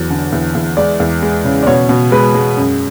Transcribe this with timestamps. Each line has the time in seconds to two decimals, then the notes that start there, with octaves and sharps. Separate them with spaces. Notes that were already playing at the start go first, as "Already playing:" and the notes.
Already playing: E2 F#3
0.10 D3
0.32 E2
0.55 E2
0.77 G#3 D5
1.00 E2
1.22 G#3
1.45 C#3
1.63 D5
1.67 B2 C#5
1.89 B2
2.12 G#3 B4
2.35 G#3
2.57 F#2